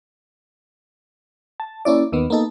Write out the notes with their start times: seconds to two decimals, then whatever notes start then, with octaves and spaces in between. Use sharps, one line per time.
1.60 A5
1.85 A#3 C#4 E4 D5
2.12 D#2 D#3 B3
2.30 A#3 B3 D#4 A4